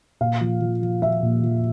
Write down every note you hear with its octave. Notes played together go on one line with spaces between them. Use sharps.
A#2 F5
F3
F3
F3
F3 E5
A#2
F3